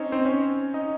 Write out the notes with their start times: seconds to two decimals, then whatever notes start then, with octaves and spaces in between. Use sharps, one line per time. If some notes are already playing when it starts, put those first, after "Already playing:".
Already playing: C4 C#4 D#4 C5 C#5 D#5
0.12 C4 C5
0.25 C#4 C#5
0.74 D#4 D#5